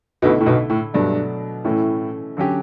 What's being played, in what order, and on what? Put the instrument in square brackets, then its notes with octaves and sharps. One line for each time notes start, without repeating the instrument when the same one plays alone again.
[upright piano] B1 B2 [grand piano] D3 A3 E4
[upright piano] A2
B1 B2
A2
[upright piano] G2 [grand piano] B2 F#3 A3 D4
[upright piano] A2 [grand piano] E3 A3 C#4
[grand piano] D3 F#3 C#4 G4